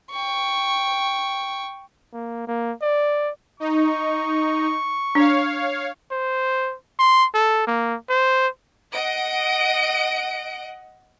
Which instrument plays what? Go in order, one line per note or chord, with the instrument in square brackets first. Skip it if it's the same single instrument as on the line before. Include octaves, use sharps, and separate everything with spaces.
[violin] G5 C#6
[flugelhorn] A#3
A#3
D5
[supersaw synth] D#4 [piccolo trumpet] C#6
[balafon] D4 [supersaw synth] C#5 F5
[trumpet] C5
C6
A4
A#3
C5
[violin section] D#5 F#5 D7